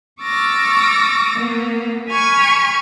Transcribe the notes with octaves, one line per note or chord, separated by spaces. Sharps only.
C#6 D6 E6 F6 A6 A#6
A#3 B3
G#5 B5 C#6 F6 G#6